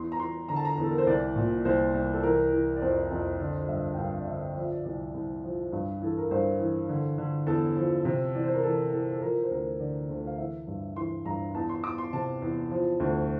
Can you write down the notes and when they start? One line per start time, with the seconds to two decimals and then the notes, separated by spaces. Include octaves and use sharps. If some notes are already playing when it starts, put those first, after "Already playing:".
Already playing: E2 C6
0.12 A#5
0.19 E2 C6
0.49 D3 A#5
0.56 A5
0.65 A#5
0.77 E2
0.83 A4
0.91 A#4
0.98 C5
1.06 C2 D5
1.36 A#2
1.65 C2 C5
1.94 C2
2.14 A4
2.23 E3 A#4
2.52 E3
2.76 D5
2.82 F2 C5
3.11 F2
3.40 D3 D5
3.69 G2 E5
3.93 G5
3.98 G2 F5
4.19 D5
4.27 D3 E5
4.56 F3 D5
4.64 E5
4.72 D5
4.85 C2 D5
5.14 C2
5.43 F3
5.72 G2
6.02 E3 A4
6.18 A#4
6.31 G2 C5
6.60 E3
6.89 D3
7.18 D3
7.47 E2 A4
7.76 F3
8.05 C3
8.34 E3 D5
8.44 C5
8.54 A#4
8.63 E3 A4
8.92 E3 A4
9.10 A4
9.22 F3 A#4
9.42 C5
9.51 D2 A#4
9.80 D3 D5
10.09 D2
10.27 F5
10.38 E3 E5
10.67 G2
10.96 E3 C6
11.25 G2 A#5
11.54 E2 A5
11.69 C6
11.84 E2 D6
11.98 C6
12.13 C3 A5
12.42 E2
12.71 F3
13.00 D2